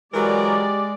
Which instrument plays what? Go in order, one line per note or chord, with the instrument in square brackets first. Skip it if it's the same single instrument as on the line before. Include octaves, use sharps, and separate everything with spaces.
[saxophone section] E3 F#3 A#4 [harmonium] G#3 [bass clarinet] G4 [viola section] D5